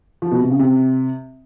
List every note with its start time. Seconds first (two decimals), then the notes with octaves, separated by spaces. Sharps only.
0.22 F3
0.31 B2
0.41 C3
0.50 C#3
0.59 C3